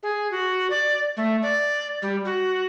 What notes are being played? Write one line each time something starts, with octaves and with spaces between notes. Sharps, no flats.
G#4
F#4
D5
A3
D5
G3
F#4